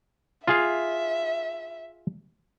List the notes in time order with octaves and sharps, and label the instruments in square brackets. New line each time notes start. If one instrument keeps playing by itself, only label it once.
[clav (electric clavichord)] F4 G#4 F5 [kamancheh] E5